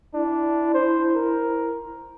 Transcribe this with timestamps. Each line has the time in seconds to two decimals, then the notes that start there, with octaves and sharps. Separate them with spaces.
0.14 D4 E4
0.74 C5
1.15 A#4